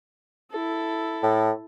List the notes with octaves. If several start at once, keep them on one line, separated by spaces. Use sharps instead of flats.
E4 A4
A2